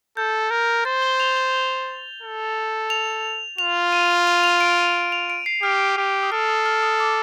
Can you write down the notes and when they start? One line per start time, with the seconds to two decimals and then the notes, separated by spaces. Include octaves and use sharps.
0.17 A4 G6
0.50 A#4
0.85 C5 A6
1.02 G7
1.20 F7
1.36 G7
2.22 A4
2.90 F7
3.58 F4 F7
3.92 D#7
4.27 F7
4.44 F7
4.61 D7
4.78 D#7
5.12 F7
5.30 D7
5.46 C7
5.63 G4 F6
5.97 G4
6.23 D#6
6.32 A4 F6
6.49 D#6
6.66 F6
6.83 D#6
7.00 D6